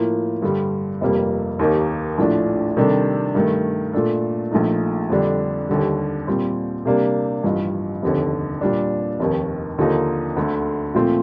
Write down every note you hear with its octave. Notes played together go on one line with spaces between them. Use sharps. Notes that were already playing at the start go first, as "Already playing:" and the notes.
Already playing: A2 F3 A#3
G2 D3 G3
F1 F2 C3 G3 A#3
D#2 D#3 A#3 D#4 G4
A#1 A2 F3 A3 D4
C3 D#3 G3 D4 A4
G2 D#3 A3
A#2 A3 D4 A4
A#1 A#2 A3 D#4
F2 D3 G3 D4
D#2 D3 G3
A#2 G3 C4
C3 G3 A#3 D4
A1 G2 F3
F1 D#2 D3
A#2 G3 D4
F1 D#2 D#3
D#2 D3 F3 A#3 D#4
D2 D3 A3
A#2 F3 A3 C4 F4